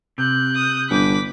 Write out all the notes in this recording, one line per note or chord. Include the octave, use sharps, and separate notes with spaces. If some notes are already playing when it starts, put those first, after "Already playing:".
C3 F#6 G6
D#6
G1 B5 D6